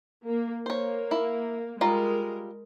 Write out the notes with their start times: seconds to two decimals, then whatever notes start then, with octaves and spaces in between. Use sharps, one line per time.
0.25 A#3
0.66 A#3 C5 C#5
1.11 E4
1.81 G3 G#3 F4 A#4 A#5